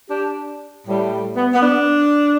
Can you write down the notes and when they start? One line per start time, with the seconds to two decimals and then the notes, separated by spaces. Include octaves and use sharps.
0.09 D4 G4
0.86 A2 G3
1.37 B3
1.53 B3
1.62 D4